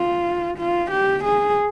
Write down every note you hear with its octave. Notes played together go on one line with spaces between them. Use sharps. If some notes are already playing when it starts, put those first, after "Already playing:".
Already playing: F4
F4
G4
G#4